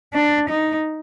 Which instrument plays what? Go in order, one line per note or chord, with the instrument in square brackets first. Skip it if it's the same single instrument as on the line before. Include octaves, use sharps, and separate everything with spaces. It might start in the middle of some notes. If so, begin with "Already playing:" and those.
[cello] D4
D#4